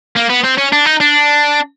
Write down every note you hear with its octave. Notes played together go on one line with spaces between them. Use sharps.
A#3
B3
C4
C#4
D4
D#4
D4